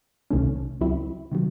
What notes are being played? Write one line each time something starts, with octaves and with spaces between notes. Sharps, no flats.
C2 C3 D#3 A3 C#4
C#2 C#3 F#3 C4 E4
C3 D#3 F#3